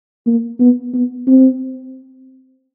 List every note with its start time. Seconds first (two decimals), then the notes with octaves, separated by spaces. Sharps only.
0.27 A#3
0.60 B3
0.94 B3
1.27 C4